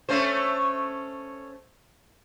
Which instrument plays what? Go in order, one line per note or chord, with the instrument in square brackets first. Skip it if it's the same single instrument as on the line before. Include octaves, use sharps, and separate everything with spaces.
[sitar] A3 C#4 C5